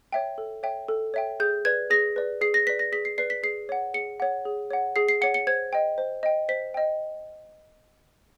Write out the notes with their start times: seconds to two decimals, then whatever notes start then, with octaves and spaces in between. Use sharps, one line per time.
0.13 C#5 E5 G5
0.38 A4
0.63 C#5 E5 G5
0.88 A4
1.14 C#5 E5 G5
1.40 G#4 G6
1.65 B4 D5 G#6
1.90 G#4 A#6
2.16 B4 D5
2.41 G#4 C7
2.54 A#6
2.67 B4 B6
2.70 D5
2.79 A#6
2.92 G#4 B6
3.05 C7
3.18 B4 D5 C7
3.30 B6
3.43 G#4 C7
3.69 C#5 F#5
3.94 G#4 C#7
4.20 C#5 F#5
4.45 G#4
4.71 C#5 F#5
4.96 G#4 C7
5.09 C7
5.21 C#5 F#5 C#7
5.34 C#7
5.47 C5 G#6
5.73 D#5 G5
5.98 C5
6.23 D#5 G5
6.49 C5 B6
6.74 D#5 G5